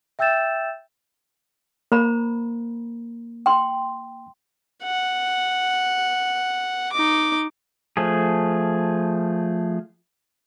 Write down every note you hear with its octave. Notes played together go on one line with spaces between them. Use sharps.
E5 G5 E6 G6 A6 E7
A#3 C5 A#5 B5
G5 C6
F#5
D#4 D6
F3 A3 G#4